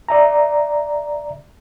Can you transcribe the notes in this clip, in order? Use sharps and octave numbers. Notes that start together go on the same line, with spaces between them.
D5 E5 A#5